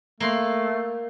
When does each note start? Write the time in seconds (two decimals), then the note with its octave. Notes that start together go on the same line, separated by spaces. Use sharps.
0.20 A3 A#3 C6